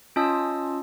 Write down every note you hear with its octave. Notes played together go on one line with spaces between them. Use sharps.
C#4 F4 D#5 A5 D#6 E6